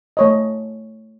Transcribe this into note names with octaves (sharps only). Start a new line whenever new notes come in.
A3 C#5 D#5